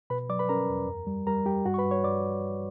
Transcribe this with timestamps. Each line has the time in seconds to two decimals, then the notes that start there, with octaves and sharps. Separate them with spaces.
0.10 B2 B4 B5
0.29 F#3 D5 D6
0.39 B4 B5
0.49 C#4 A#4 A#5
0.69 E2
0.87 F#2
1.07 G3
1.27 G3 A#4 A#5
1.46 G3 G4 G5
1.65 G2 F#4 F#5
1.74 C#6
1.78 B4 B5
1.85 G2
1.91 C#5 C#6
2.04 G2 D5 D6